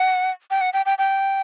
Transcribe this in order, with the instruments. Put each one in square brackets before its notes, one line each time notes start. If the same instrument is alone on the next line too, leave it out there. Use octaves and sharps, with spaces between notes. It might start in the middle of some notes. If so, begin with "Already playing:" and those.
Already playing: [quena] F#5
G5
F#5
G5
G5
G5